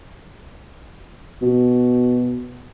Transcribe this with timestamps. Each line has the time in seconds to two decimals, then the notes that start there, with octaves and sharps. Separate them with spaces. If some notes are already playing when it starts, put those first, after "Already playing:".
1.42 B2